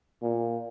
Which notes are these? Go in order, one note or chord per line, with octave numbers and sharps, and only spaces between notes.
A#2